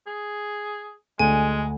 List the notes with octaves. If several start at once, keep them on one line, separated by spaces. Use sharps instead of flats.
G#4
D2 G#3 G#5